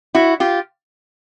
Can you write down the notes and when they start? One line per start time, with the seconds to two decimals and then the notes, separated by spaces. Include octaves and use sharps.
0.15 E4 F#4
0.40 F4 G4